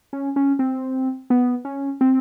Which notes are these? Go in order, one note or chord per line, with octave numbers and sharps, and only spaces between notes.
C#4
C#4
C4
B3
C#4
C4